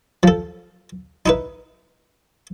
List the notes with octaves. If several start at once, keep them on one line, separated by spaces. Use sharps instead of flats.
F3 A4
D#4 E4 B4